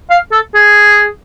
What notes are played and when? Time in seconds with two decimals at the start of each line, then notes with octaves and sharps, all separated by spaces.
0.10 F5
0.32 A4
0.54 G#4